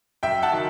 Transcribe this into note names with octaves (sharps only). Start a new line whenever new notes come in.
F#2 E5 G5
F#5 A5
D#3 F#3